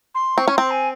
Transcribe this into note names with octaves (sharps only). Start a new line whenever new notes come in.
C6
C4 C#6
C#4
C4 C6
G#5